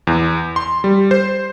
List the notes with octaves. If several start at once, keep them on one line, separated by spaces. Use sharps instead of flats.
E2
C6
G3
C5